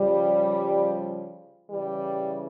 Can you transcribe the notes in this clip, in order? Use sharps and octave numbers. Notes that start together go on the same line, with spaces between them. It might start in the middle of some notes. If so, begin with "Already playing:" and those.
Already playing: C#3 F3 G3
C#3 E3 G3